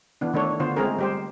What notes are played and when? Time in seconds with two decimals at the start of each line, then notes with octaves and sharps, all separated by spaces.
0.21 E3 B3 D4
0.34 D#3 A3 D4 A4 C#5
0.60 D3 B3 F4 C5
0.76 G#3 A3 C4 C#4 G#4 A#4
0.99 G3 G4 C5